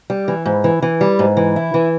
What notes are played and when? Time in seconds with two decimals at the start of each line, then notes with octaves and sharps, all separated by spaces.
0.10 G3
0.28 E3
0.46 G#2
0.64 E3
0.82 E3
1.01 G3
1.19 G#2
1.37 E3
1.56 E4
1.74 E3